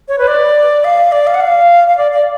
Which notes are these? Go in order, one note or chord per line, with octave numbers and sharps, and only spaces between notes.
C#5
B4
D5
F5
D5
F5
F#5
F5
F5
D5
D5